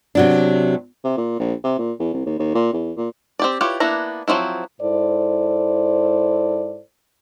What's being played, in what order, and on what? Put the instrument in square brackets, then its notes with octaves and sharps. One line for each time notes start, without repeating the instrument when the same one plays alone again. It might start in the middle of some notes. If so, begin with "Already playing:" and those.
[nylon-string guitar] C3 F#3 D4
[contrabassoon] C3
A#2
A#1
C3
A#2
E2
C2
D#2
D#2
A#2
E2
A#2
[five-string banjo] C4 G4 D5
E4 F4 G4 B4 C#5
A#3 B3 D4 E4 A#5
F3 F#3 C4 E4
[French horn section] G#2 E4 A4 C5 D5